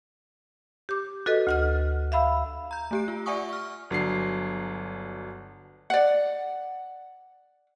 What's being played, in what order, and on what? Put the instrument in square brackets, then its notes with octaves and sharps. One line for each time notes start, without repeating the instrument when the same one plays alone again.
[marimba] G4 D6
F#4 A4 B4 D#5
D2 F#5 F6
E5 F5 B5 E6
[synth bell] A#5 G6
A3 G4 D7
F4
D5 E5 F#5 G#5 C#6 D#6
C#6 F6
[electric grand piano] G1 F#3 D4 C7
[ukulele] D5 F#5